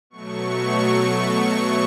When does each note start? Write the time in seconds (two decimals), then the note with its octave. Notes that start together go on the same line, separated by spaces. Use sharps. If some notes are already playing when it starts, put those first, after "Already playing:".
0.10 B2 F#3 A3 C#6